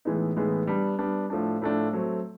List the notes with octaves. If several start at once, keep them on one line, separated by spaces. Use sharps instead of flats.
A2 E3 G#3 B3 D#4
A2 E3 G#3 B3 D#4
G3 B3 D4
G3 B3 D4
A2 F3 A3 D4
A2 F3 A3 D4
F#3 A3 C4